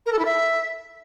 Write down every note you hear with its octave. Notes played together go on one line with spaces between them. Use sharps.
A#4
A4
E4
E5